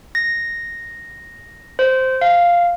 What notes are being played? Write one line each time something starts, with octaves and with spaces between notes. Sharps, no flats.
A#6
C5
F5